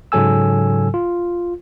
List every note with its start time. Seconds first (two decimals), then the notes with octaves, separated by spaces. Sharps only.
0.12 G#2 C#3 F#3 A4 G#5 E6
0.94 F4